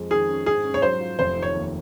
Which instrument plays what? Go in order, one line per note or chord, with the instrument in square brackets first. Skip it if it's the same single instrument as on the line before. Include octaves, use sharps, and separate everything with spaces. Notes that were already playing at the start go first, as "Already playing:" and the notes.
Already playing: [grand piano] F2 G#3
[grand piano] D#3 [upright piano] G#4
[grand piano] C#4
[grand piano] G#2 [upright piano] G#4
[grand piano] C#4
[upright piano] C#5
[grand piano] F#3 [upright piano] C5
[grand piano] F4
[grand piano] F1 [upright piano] C5
[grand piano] D#3
[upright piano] C#5
[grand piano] D#2